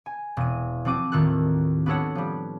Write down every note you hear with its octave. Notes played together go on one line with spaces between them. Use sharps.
G#5
E1 D#7
F3 C4 F#4 D6 D#7
D#2 A2 D#3 F4 A4 F#6
B3 D4 F#4 A4 C#5 F#5
F3 G3